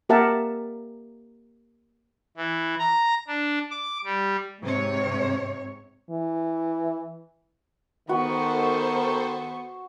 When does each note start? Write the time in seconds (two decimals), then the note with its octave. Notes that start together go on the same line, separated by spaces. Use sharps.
0.09 A#3 G4 A#4 E5 F#5 A5
2.37 E3
2.79 A#5
3.28 D4
3.71 D6
4.04 G3
4.61 G#2 C3 C#5
6.10 E3
8.09 D#3 B3 F#4 A4 C5 C#6